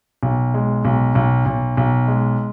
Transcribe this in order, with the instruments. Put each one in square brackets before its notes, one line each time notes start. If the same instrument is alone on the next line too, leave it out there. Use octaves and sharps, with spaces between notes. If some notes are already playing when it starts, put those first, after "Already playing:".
[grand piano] B1
G#3
B1
B1
B1
B1
G#3